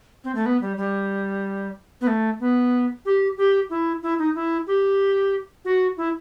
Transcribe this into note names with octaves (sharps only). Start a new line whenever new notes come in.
C4
A3
B3
G3
G3
B3
A3
B3
G4
G4
E4
E4
D#4
E4
G4
F#4
E4